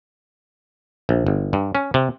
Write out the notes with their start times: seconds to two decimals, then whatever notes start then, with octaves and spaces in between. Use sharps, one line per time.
1.09 A#1
1.27 G1
1.53 G2
1.75 C#4
1.94 C3